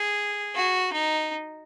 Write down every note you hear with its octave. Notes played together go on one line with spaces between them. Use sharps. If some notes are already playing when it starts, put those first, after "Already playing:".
Already playing: G#4
F#4
D#4